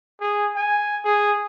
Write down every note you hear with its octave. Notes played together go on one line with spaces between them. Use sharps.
G#4
G#5
G#4